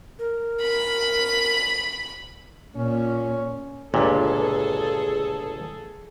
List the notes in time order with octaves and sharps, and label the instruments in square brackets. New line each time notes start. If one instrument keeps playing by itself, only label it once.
[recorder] A#4
[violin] B5
[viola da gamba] A#2 [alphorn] C#4
[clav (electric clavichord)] G1 C#2 A#2 [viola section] G#4 A4